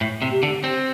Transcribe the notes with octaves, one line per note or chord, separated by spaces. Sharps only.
A2
C3
G4
D3
C4